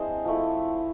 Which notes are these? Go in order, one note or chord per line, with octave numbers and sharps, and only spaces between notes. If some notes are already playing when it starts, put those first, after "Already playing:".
Already playing: G#3 C4 D4 E4 G#4 C5
F3 A3 E4